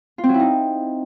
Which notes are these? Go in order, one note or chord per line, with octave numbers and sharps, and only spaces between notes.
F4
C4
F#3
E4
D#4